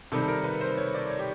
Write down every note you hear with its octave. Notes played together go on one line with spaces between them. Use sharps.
C3 D#3 G3 A4
A4
A#4
B4
C5
C#5
D5
C#5
G4